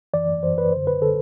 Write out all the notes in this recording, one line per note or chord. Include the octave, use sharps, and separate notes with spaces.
F#2 E3 D5
F#2 E3 C5
B4
F#2 D3 C5
B4
D3 A4